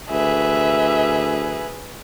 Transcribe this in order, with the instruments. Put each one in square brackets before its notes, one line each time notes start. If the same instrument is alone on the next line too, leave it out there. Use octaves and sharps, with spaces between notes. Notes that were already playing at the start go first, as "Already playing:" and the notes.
[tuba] D2 [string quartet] G#4 B4 [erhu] E5